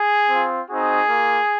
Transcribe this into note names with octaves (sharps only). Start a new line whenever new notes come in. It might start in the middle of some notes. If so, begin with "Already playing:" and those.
Already playing: G#4
C4 F4
C4 D#4 F#4 G#4
A#3 F4